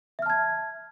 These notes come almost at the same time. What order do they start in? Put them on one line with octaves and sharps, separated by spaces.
E5 F6 A5 G#6